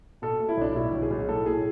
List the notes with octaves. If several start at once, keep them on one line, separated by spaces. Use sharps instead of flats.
B2 A4
A3
E4
B1 D4
B2 E4
B1
G#4
B1
A2 A4
A2 G#4